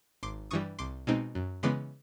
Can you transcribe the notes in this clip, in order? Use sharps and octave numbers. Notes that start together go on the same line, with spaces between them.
G#1 C6 D6
G2 E3 G3 C#6 D#6
C2 C6 D6
B2 G#3 C4 D#4
F#2
C#3 E3 G#3 B3 C6 D6